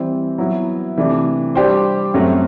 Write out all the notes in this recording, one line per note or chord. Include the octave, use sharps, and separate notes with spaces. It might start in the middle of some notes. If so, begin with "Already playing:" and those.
Already playing: E3 G3 C4
F#3 B3 E4
C3 E3 A3 D4
G3 D4 G4 C5
F#2 F#3 A3 C4